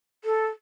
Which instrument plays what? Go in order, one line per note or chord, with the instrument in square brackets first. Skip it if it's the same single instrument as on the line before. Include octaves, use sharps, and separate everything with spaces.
[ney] A4